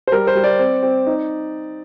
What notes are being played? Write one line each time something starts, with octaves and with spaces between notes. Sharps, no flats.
C5
G3 A#4
C5
G3
D5
C4
C4
D#4